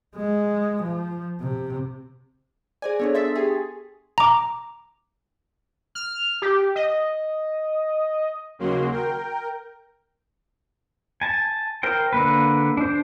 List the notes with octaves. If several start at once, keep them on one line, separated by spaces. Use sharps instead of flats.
G#3
F3
C3
G#4 C5 D5 G#5
B3 D4 A4 C#5
E5 C6 A6 B6
G4 G#4
A#5 D6
F6
G4
D#5
D#2 C#3 F#3 A#3 F#4 C6
A#4 G5
G#5 A5
A#4 C5 G5
D3 A#3 B4
D4 C5